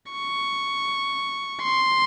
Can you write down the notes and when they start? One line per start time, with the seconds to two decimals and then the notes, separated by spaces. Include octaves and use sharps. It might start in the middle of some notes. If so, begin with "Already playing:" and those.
0.12 C#6
1.63 C6